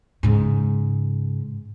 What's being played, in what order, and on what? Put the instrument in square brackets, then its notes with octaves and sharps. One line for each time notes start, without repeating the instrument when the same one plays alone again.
[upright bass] G#2 C#3